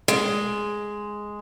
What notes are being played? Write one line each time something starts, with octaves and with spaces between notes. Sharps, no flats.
G#3